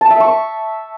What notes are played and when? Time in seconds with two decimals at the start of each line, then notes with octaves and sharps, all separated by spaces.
0.01 A5
0.11 E5
0.20 C#6